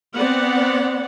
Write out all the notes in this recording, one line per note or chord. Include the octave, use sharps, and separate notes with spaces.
B3 C4 D5 F#5